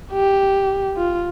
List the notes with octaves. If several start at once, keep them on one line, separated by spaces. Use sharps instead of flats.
G4
F4